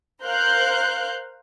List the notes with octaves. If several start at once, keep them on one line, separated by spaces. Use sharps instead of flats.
A#4 C5 F5 F#6 G6